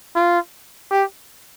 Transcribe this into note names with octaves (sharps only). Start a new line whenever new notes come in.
F4
G4